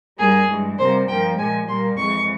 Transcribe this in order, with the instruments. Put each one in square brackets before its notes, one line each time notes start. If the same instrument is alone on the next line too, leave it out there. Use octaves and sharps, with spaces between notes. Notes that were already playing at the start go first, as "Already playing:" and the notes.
[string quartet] G2 G3 A#3 G#4
G2 E3 G#3
C3 G3 A#3 C5
G2 F3 A#3 G5
A#2 F3 G#3 G#5
A#2 G3 A#3 C6
F2 E3 G#3 C#6